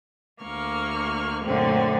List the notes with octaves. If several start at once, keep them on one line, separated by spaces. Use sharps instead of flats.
D2 A#3 C#6 F6
F#2 A#2 D3 A3 C4